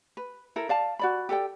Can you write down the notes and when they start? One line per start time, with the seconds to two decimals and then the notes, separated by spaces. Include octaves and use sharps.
0.17 B4
0.56 E4 A4 A#4
0.69 D5 F5 A5
0.99 F#4 D5 B5
1.29 G4 A4 D5 G5